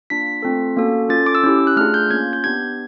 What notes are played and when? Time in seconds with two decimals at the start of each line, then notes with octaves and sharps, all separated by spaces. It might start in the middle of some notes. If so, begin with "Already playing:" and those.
0.10 A#3 D4 F4 B6
0.43 A3 C4 F4 A4
0.77 A#3 C#4 F#4 A4
1.09 C#4 F4 A4 A6
1.26 D6
1.35 E6
1.44 C#4 E4 G4
1.67 F#6
1.77 A3 D4 F4 G#4 F6
1.94 G6
2.10 A#3 C#4 F4 G#6
2.33 G6
2.44 B3 D4 G4 G#6